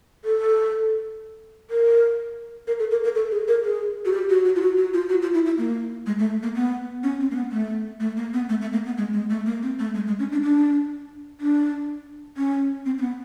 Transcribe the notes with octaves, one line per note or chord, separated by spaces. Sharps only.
A4
A#4
A#4
A4
A#4
A#4
A4
G#4
A#4
G#4
F#4
G4
F#4
F#4
F4
F#4
F#4
F4
F#4
F4
E4
E4
A#3
G#3
A3
A#3
B3
C#4
C4
A#3
B3
A3
A3
A#3
B3
A3
A3
A#3
B3
G#3
G#3
A3
A#3
C4
A3
G#3
G#3
C#4
D4
D4
D4
C#4
C4
C4
B3